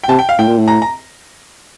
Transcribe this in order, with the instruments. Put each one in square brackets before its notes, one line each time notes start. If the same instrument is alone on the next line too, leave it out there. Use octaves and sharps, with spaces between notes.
[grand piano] G5
[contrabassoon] C3 [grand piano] A5
[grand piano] G5
F5
[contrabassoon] A2 [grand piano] G5
[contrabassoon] A#2
A2
[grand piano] A#5
A#5